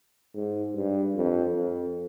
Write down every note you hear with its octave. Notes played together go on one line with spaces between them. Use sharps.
G#2
G2
F2
F2